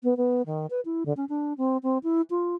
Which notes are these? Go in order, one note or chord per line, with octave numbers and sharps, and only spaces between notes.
B3
B3
D#3
B4
E4
D3
C#4
D4
C4
C4
E4
F4